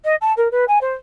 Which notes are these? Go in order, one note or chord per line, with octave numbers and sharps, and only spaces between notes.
D#5
A5
A#4
B4
G#5
C5